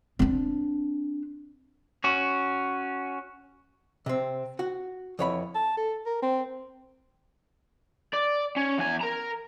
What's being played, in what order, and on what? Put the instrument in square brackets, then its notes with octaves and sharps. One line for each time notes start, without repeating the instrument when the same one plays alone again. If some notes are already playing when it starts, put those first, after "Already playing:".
[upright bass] C4 D4
[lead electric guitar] C#4 F#4
[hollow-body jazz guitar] C3 C4
F#4 F#5
F2 E3 C#5 F#5 B5
[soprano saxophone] A5
A4
A#4
C4
[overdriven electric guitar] D5
C#4
E2 G#5
A#4 A#5